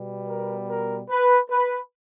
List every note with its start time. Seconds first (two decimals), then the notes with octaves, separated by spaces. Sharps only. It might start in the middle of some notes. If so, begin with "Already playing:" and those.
Already playing: B2 G3 B3
0.29 A#4
0.69 A#4
1.10 B4
1.51 B4